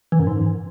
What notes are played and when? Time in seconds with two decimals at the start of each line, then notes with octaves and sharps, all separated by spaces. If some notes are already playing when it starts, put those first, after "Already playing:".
0.12 E3
0.20 F#2
0.27 G#2